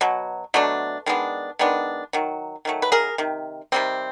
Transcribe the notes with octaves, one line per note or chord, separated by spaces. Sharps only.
B2 F#3
B2 F#3 A3 D4
D#3 G#3 B3 D4
D#3 G#3 B3 D4
D#3 F#3
D#3 F#3 A3
B4
G#4 A#4
C3 D#3
C3 D#3 G3 C4